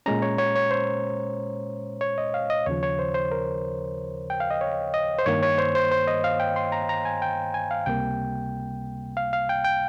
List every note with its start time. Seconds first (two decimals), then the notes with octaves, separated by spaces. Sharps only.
0.06 A#2 G#3 C#4 A#5
0.22 C#5
0.38 C#5
0.55 C#5
0.71 C5
2.01 C#5
2.18 D#5
2.34 F5
2.50 D#5
2.66 D#2 C#3 F3 C#5
2.83 C#5
2.99 C5
3.14 C5
3.32 A#4
4.30 G5
4.40 F5
4.51 D#5
4.61 C#5
4.94 D#5
5.19 C5
5.26 G2 D#3 A#3 C#5
5.43 C#5
5.58 C5
5.75 C5
5.92 C5
6.08 D#5
6.24 F5
6.40 G5
6.56 C6
6.72 A#5
6.89 A#5
7.05 G#5
7.22 G5
7.54 G#5
7.71 F5
7.86 C#2 C3 G3 A#3 G5
9.17 F5
9.33 F5
9.49 G5
9.65 G5